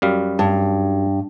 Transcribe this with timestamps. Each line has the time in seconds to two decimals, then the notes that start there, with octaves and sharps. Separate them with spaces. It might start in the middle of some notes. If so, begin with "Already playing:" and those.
0.02 F#2 G3 F5
0.39 G2